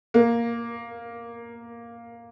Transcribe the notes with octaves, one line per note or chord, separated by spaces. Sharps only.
A#3